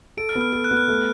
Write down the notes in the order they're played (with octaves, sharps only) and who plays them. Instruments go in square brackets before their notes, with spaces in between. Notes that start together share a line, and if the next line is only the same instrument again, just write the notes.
[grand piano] A4 [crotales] D7
[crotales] F6
[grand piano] B3
[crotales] F6
[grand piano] A4 [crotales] F6
[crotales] F#6
[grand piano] B3
[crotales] F6
[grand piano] A3